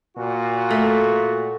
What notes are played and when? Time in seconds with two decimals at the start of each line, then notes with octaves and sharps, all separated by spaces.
0.16 A#2 F#4
0.71 A3